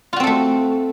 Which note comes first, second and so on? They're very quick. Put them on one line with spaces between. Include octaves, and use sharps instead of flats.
F4 F#4 C4 A4 A3